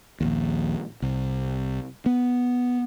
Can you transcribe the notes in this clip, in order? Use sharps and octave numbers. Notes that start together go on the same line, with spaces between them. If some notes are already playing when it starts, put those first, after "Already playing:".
A#1 D#2
C2
B3